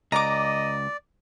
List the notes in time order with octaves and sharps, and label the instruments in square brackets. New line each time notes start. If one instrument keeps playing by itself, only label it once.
[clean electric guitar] C#2 [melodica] D5 [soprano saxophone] D#5 [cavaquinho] A#5 D6